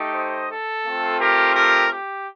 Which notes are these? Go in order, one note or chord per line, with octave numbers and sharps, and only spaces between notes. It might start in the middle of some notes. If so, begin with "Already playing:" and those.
Already playing: A3 D#4 G4
C5 D#5
A4
A3 C4 F4
G4 A#4
G4 A#4
G4